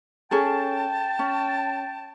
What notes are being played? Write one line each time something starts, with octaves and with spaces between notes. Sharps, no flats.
C#4 G#4 A4 G5 A5
C#4